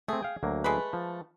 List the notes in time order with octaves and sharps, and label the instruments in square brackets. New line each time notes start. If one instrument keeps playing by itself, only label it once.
[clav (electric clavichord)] A3 C4 [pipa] G#4
[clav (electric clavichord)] F5 G5
D2 F#3 A#3
[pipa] G#3 A3 B4
[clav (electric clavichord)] F3